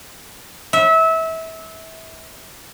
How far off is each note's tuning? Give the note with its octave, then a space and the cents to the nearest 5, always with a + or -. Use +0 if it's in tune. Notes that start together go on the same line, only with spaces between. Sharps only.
E5 -25